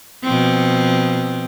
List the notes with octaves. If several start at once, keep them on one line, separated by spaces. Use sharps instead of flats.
B2 F3 C4